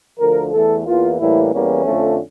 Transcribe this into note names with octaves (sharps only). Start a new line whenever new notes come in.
D2 D3 F3 A#4
E2 E3 A3 A4
E2 E3 A#3 F4
A2 E3 G3 A#3 E4
E2 E3 G3 A#3 C#4
F2 D3 F3 A3